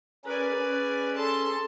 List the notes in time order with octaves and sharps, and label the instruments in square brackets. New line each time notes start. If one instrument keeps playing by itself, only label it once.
[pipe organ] C#4 G#4 A#4 [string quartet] B4 D5 G#5
[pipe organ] C#4 G#4
[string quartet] A4 A5 C6